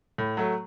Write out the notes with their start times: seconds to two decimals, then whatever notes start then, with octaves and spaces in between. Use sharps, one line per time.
0.18 A2
0.37 F#3 A3